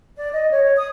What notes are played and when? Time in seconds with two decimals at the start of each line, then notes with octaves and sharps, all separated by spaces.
0.17 D5
0.33 D#5
0.51 C#5
0.63 C#5
0.77 D#6